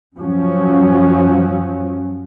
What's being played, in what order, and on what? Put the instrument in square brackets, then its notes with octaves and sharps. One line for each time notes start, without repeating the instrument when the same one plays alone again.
[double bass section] F#2 F3 F#3 C#4